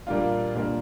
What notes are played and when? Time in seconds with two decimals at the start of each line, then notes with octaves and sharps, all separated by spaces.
0.07 A#2 G3 A#3 D4 F4
0.55 A#2 G3 A#3 D4 F4